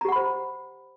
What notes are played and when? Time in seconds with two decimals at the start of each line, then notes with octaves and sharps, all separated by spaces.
0.01 A#5
0.05 G4
0.09 F#5
0.12 B5
0.16 C5